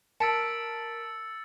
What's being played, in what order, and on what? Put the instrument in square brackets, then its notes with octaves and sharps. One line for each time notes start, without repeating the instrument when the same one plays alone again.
[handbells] A#4 B6 D7 [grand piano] A5 [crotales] E6 A6 C#7